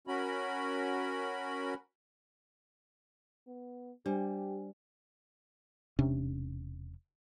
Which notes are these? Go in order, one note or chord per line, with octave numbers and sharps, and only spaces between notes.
C#4 F#4 A#4 B5
B3
G3 D4 G4 C5 G#5
E1 C3 C#4 D4